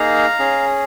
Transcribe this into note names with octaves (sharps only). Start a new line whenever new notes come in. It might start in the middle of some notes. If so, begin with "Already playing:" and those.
Already playing: A#3 D#4 G#4 F5 A#5
C#4 G#4